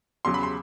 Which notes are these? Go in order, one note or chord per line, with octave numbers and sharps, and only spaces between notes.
E2 C#3 F#3 C6
B5
C6